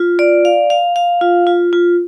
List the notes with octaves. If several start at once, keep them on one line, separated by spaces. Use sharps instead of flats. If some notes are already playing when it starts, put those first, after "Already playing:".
Already playing: F4
D5
F5
F5
F5
F4
F4
F4